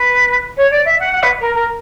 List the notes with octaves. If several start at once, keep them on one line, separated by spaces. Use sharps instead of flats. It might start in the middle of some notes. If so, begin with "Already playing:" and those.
Already playing: B4
C#5
D5
E5
F#5
F#5
B4
A#4
A#4